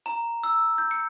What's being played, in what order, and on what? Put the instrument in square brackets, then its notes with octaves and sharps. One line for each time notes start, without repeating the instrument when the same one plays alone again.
[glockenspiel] A#5
E6
G6
C#7